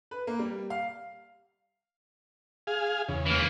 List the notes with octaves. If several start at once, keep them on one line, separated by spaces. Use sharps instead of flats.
B4
A#3
G3
F5
G#4 F5
E2 C#3
E3 A#3